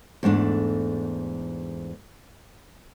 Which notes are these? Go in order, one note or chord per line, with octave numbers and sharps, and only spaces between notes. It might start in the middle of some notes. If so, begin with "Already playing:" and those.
E2 G#2 A3 D4